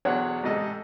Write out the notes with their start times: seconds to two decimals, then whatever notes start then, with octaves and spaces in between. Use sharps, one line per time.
0.05 B1 E2 D4 C#5 F#5
0.43 A1 G#2 C3 G#4 A4 D#5